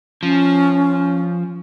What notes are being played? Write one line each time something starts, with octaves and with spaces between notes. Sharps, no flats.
F3 C#4